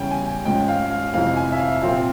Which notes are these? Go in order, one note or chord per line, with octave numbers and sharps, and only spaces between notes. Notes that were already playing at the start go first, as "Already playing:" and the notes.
Already playing: E2 C#3 G3 C#4 G5
G#5
G#2 F3 G#3 C#4 G5
F5
F5
F2 C3 E3 G#3 F5
G#5
E5
F5
A#2 F3 C4 F5